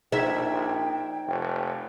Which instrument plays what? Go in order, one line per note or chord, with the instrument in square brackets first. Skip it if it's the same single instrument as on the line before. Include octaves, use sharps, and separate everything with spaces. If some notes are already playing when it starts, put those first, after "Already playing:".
[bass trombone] A#1 [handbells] D#4 G#6 [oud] E5 [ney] G5
[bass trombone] F1